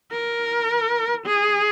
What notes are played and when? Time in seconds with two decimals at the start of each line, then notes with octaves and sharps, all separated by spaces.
0.11 A#4
1.26 G#4